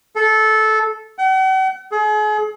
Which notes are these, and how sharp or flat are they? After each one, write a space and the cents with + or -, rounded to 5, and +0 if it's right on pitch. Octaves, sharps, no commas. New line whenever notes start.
A4 -15
F#5 +45
G#4 +40